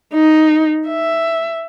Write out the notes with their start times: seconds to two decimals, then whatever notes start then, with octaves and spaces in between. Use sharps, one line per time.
0.14 D#4
0.88 E5